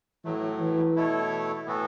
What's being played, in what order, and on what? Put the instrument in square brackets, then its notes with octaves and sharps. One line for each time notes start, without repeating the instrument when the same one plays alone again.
[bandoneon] A2 F#3 A3 [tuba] E3
[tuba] E3
[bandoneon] B2 A3 E4 A4 C#5
A2 E3 B3 F#4 A4